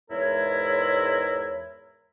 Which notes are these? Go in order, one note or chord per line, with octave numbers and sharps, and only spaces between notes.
E2 G#2 G#3 E4 A#4 C#5